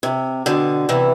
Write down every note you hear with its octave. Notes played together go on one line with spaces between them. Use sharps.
C3
B2 D3
C3 E3